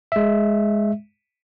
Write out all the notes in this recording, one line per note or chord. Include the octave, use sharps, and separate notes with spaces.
G#3 E5